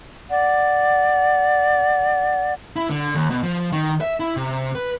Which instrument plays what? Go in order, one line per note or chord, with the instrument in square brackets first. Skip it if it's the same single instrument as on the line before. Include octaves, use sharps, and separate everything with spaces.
[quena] D5 [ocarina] F#5
[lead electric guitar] E4
D3
D#2
B2
F3
D#3
E5
E4
C3
B4